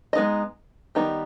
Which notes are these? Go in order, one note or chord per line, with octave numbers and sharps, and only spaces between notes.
G#3 B3 D#4 A#4 D#5
D#3 G3 B3 D#4 G4